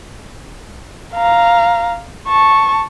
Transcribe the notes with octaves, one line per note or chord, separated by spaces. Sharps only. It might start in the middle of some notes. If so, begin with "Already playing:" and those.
F5 A#5
A5 C#6